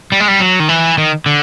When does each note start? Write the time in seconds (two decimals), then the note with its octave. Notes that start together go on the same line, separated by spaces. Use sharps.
0.12 G3
0.20 G#3
0.28 G3
0.40 F#3
0.60 D#3
0.69 E3
0.98 D#3
1.26 D3